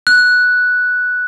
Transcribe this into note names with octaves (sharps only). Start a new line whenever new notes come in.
F#6